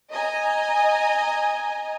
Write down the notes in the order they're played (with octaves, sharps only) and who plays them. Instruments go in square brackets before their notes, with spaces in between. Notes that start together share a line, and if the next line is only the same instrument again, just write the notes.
[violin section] D#5 G#5 A#5